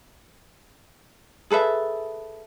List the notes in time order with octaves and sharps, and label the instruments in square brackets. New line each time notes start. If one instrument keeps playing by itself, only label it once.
[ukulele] G#4 A4 B4 E5